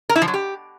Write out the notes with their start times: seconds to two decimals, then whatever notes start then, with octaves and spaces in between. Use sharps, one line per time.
0.09 A#4
0.16 E4
0.22 F3
0.28 F#3
0.34 G4